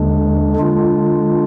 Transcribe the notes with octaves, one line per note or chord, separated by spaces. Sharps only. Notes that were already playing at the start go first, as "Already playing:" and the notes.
Already playing: D#2 D3 G#3 D4
D3 G#3 D4 F4